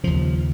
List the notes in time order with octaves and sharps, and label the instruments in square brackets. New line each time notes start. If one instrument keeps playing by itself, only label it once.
[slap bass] D#2 C#3 F3